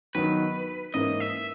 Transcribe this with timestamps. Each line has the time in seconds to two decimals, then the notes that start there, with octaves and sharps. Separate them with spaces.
0.15 D#3 F#3 B3 D#4 B4
0.94 G#2 E3 A#3 C#4 D#5
1.20 E5